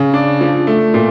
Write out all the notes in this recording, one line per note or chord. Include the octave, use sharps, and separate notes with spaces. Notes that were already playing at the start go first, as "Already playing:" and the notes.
Already playing: C#3
D4
F3
A3
A#2